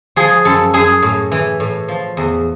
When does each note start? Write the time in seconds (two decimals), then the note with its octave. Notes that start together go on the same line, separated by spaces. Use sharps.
0.16 F3 G#4
0.45 F#2 A4
0.74 F#2 G#4
1.02 A2
1.32 E3
1.60 A2
1.88 F3
2.17 E2